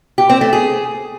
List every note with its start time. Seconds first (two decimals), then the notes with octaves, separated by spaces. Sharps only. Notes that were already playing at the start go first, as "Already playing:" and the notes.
0.18 G4
0.30 C4
0.41 A3
0.53 G#4